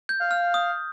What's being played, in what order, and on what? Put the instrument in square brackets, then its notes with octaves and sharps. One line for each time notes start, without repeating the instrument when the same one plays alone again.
[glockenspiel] G6
[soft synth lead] F5
[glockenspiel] F6
D#6